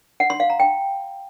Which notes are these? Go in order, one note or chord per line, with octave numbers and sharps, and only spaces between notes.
F#5
C6
F5
A#5
G5